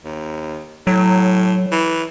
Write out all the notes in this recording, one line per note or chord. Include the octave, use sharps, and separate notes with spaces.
D#2
A2 F#3
E3